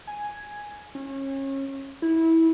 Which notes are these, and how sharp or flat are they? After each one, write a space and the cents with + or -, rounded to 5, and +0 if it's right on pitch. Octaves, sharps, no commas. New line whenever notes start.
G#5 +0
C#4 -30
E4 -20